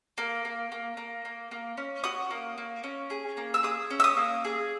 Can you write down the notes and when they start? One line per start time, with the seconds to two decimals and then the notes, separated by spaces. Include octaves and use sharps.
0.18 A#3
0.45 A#3
0.72 A#3
0.97 A#3
1.25 A#3
1.51 A#3
1.77 C#4
2.04 F#4 D#6
2.31 A#3
2.58 A#3
2.84 C#4
3.10 G#4
3.37 A#3
3.54 E6
3.63 G#4 D#6
3.91 C#4
4.00 E6
4.04 D#6
4.17 A#3
4.45 G#4